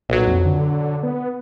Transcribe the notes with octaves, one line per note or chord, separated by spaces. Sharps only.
B1 A#2 F#3
F2
D3
B3